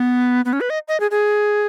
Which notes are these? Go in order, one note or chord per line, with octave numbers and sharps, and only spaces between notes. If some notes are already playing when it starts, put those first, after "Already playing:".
Already playing: B3
B3
C#4
B4
D#5
D#5
G#4
G#4